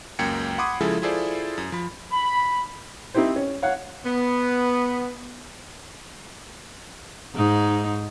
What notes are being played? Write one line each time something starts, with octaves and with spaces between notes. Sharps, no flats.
C#2 F#2 A#3 G5 G#6 C#7
F#5 B5 C6 D6 D#6 G#6
C#3 F3 G#3 E4 G#4 A4
E4 F4 G#4 A4 C5 D5
F#2
F3 B5
B5
C4 D#4 E4 G4 C5
C#4
C#5 F5 F#5
B3
G#2 D#4